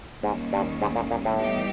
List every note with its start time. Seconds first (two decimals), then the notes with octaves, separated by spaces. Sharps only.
0.23 D#2 G#2 D#3 G3 A#3 C#4
0.53 G2
0.82 G#2
0.96 A#2
1.11 A#2
1.25 A2
1.39 E3 G3 B3 D#4 G4